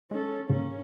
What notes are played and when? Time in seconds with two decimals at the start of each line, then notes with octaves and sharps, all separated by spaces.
0.11 G#3 C#4 A4
0.50 G#2 C#3 A#3 C#4